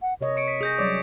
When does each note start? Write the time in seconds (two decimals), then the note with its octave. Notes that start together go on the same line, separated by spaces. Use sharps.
0.02 F#5
0.21 C3 A#4 C#5 D#5
0.36 C#6 C#7 D7
0.48 B6 D#7
0.61 G#4 D#6 G6 A#6
0.79 F#3 G3 C#5 D5 D6 A#6